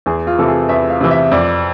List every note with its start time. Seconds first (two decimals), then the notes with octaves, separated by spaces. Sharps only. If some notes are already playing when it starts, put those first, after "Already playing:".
0.06 E2 G#4
0.27 F4
0.38 C3 E3 A4
0.48 G#4
0.69 E2 E5
0.90 F5
1.01 C3 E3
1.11 E5
1.32 F2 D5